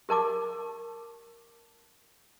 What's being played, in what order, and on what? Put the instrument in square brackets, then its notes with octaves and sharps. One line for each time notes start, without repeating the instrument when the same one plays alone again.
[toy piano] G4 A#4 A5 D6